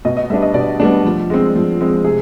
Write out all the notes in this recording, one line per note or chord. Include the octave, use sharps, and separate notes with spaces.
B2 D#5
D#5
G3 B3 D4 E5
D#5
B2 D5
G3 B3 D4
F3
G#3 C4
F3
G#3 C4
C3 G#4